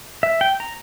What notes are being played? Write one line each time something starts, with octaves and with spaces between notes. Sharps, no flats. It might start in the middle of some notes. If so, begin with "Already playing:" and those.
E5
G5
A#5